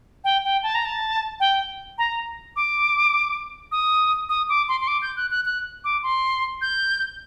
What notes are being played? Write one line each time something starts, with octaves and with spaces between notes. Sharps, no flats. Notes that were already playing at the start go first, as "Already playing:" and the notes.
G5
G5
A5
A#5
A5
G5
A#5
D6
D#6
D#6
D6
C6
C6
D6
G6
F#6
F#6
F#6
D6
C6
G6